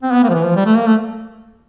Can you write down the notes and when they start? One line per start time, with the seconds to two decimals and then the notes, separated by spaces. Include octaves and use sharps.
0.03 C4
0.13 B3
0.24 A#3
0.29 F3
0.34 E3
0.45 F3
0.56 G3
0.66 A3
0.77 A#3
0.87 A3